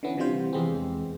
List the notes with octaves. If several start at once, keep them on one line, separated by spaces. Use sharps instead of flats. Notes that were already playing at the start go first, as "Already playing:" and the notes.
D3 E3 B3 C#4
C3 E3 F3 G3 F4 C5
E2 C3 G#3 B3 C4